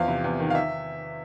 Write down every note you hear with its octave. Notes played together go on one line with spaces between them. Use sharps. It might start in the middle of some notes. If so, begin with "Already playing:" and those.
Already playing: E2 F3 F5
C3
E2
D#3
F5
E5